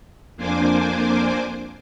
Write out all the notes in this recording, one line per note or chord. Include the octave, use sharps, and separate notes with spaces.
F2 A#3 D4 C5 G#5 D6